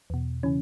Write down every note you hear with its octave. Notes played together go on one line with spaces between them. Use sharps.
E2 B2
C#3 E3 C#4